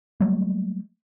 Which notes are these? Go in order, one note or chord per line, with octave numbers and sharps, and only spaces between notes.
F#3 G3 A3 A#3